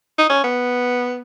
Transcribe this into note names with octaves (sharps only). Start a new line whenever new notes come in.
D#4
C#4
B3